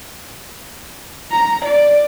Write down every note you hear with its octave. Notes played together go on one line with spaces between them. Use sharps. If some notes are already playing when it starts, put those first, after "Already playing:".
A#5
D5